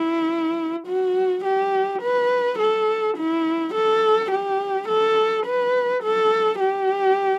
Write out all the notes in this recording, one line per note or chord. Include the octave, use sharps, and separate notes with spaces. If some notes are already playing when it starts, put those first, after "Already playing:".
Already playing: E4
F#4
G4
B4
A4
E4
A4
G4
A4
B4
A4
G4